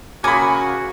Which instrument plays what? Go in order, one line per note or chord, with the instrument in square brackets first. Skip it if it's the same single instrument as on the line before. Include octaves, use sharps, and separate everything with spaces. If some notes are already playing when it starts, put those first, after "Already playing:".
[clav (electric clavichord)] C#3 A#3 [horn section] F#4 [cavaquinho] G#5 D#6 [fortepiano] B5 D6